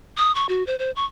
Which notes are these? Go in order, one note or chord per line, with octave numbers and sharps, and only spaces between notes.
D#6
C#6
F#4
C5
C5
C#6